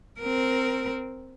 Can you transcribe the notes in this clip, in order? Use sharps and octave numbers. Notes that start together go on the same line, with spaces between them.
C4 A#4